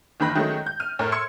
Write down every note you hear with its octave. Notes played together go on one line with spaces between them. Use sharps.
F#1 D#3 E3 B5 F#6 A#6
D#3 F#3 G#3 A3 C#4
G6
F6 D#7
A2 A#4 F6
C6 E6 G#6 C#7